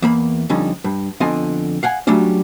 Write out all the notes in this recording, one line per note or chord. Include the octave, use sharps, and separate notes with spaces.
E2 A#3 B5
F2 D3 G3 C#4 D#4
G2
F2 D3 B3 F4 D#5 G#5
F5 F#5 G#5
F#3 G3 A3 C#4 D4 F4